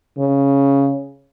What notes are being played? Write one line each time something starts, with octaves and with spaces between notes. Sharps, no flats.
C#3